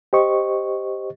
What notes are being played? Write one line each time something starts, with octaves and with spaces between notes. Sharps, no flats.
G4 C5 D#5 C#6